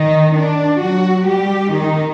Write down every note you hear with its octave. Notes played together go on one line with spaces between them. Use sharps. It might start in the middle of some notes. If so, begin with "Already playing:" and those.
Already playing: D#3 D#4
D4
F#3 F#4
G3 G4
D#3 D#4